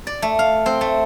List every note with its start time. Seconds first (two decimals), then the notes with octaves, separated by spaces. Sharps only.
0.07 D5
0.22 A3
0.39 F5
0.66 C4
0.81 A3